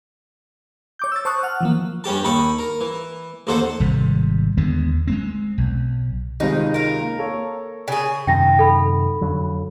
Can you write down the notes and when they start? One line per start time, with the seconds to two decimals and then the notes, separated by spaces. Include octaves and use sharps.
0.99 C#5 D6 G6
1.12 E6 A6
1.25 C5 A5 C#6 D#6 F#6
1.43 F#5 F6
1.61 E3 F3 A#3
2.04 G2 C#4 G4 A5
2.24 D#2 A5 B5 C#6 D#6
2.58 A#4
2.81 E3
3.47 A1 D#2 A4 C5 F#5 A5
3.80 G#1 C3 G3
4.57 D#2 D3 G#3 B3
5.07 G#3 B3 C4
5.58 B1
6.40 C#2 C3 D#3 D#4
6.74 A#4 F5
7.01 A#3
7.18 A#3 A4 C#5
7.88 C#3 G#4
8.27 F#2 C3 D#3 G5 A#6
8.59 A4 B5
9.21 F2 D3 F#3